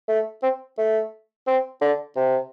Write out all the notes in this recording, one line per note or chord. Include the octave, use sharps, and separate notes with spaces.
A3
C4
A3
C4
D3
C3